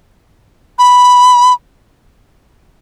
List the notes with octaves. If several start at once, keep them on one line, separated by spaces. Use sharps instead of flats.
B5